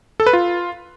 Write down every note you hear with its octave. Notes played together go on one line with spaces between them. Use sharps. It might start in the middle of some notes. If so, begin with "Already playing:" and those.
A4
B4
F4